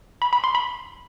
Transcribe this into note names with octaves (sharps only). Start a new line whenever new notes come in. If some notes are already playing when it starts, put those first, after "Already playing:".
B5
B5
C6
B5